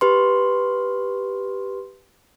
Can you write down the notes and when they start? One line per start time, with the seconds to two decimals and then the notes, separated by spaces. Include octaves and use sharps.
0.01 G4 B4 C6